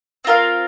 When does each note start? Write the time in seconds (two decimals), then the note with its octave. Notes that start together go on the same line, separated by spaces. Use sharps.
0.25 C4 F4 A#4 F5